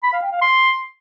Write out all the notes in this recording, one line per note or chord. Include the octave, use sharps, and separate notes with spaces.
B5
F5
G5
F5
C6